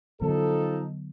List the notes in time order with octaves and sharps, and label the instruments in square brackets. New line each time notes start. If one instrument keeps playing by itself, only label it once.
[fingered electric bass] D3 F#3 B3 [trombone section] F3 D#4 A4